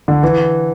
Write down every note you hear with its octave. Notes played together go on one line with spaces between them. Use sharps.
D3
E3